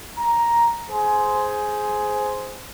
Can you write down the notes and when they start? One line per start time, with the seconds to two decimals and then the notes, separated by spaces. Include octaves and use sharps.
0.17 A#5
0.89 G#4 C5